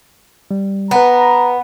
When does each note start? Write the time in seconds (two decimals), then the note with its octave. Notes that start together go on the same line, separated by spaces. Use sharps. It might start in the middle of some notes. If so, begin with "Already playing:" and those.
0.51 G3
0.91 B3 B4 F#5 A#5